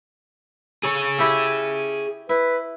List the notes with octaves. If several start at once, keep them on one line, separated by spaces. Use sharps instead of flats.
G#4 A4 C#5
E4 G4 A4
E4 B4